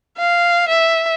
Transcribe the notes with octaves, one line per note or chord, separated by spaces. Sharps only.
F5
E5